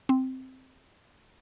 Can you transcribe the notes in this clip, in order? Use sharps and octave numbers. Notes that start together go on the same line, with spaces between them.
C4